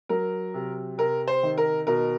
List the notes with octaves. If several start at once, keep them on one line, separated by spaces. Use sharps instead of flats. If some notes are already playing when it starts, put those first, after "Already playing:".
F#3 A#4
C3
C3 A#4
C5
D#3
A#4
B2 A#4